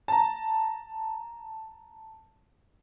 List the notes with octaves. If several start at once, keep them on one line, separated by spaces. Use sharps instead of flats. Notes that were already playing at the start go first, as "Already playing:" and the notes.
A5 A#5